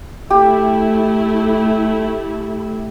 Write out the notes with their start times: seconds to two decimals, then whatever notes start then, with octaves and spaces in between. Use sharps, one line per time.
0.30 A3 E4 G4